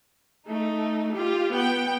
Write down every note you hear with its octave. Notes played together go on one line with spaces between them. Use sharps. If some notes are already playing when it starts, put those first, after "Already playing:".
A3 D#4
F4 G4
B3 G5